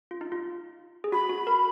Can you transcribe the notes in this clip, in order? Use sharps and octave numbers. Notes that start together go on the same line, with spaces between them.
F4
D#4
F4
G#4
F#4 B5
F#4
A#4